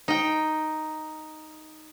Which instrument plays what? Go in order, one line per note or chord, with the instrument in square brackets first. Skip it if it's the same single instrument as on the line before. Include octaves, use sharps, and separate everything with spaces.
[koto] D#4 G5